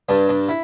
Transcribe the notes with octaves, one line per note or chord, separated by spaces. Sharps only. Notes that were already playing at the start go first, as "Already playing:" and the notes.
G2 D4
D4
E4